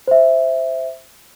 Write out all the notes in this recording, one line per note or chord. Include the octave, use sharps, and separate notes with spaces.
C5 E5